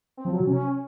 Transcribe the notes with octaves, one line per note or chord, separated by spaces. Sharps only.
C4
F3
F#3
C3
C#4